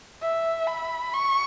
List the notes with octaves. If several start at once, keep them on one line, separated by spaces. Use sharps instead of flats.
E5
B5
C#6